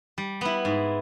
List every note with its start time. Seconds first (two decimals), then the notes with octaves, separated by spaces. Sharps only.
0.18 G3
0.41 B3 E4
0.65 G#2